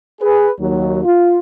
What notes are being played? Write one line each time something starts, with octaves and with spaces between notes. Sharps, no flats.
G#4 B4
D#2 F#3
F4